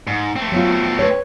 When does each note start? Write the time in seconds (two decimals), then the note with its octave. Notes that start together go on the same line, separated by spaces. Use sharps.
0.07 G#2
0.36 A3 C4
0.52 F#3 B3 F4
0.99 B4 C#5